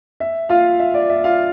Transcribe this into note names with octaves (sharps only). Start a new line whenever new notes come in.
E5
F4 F5
E5
D5
E5
F4 F5